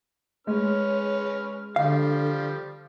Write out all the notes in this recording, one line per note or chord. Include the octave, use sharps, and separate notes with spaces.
G#3 C#4 B4 C#5 F6
D3 F3 G3 F5